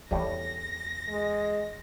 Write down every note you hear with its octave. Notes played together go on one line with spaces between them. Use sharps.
E2 A2 G3 A#6
G#3